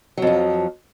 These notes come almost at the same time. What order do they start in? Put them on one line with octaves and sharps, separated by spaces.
F#3 F2 F3